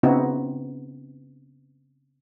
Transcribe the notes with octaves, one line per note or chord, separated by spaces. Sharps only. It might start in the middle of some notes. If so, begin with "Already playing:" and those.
C#3 B3 C4 D#4 E4 F#4